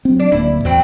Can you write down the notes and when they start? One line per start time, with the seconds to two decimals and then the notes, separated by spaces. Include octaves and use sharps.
0.05 F#3 C4
0.20 D4
0.32 D1 A#3 E4
0.65 E2 F#3 C4